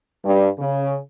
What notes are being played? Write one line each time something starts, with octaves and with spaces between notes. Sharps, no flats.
G2
C#3